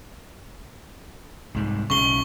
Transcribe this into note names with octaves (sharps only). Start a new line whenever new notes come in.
C2 G#2
B1 C#3 C#6 G7